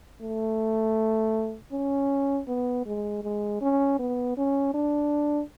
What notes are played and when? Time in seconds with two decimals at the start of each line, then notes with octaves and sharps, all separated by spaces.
0.21 A3
1.72 C#4
2.48 B3
2.86 G#3
3.23 G#3
3.61 C#4
3.99 B3
4.37 C#4
4.74 D4